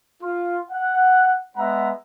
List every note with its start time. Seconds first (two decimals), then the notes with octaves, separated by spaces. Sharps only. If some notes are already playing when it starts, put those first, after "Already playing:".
0.23 F4
0.71 F#5
1.56 G#3 B3 E5 F#5 A#5 B5